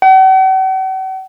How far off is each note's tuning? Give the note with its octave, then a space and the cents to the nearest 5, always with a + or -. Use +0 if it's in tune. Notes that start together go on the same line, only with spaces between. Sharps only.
F#5 +45